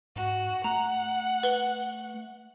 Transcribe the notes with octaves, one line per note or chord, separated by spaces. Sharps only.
G#2 F#4
A3 F#5 A#5
B4 G7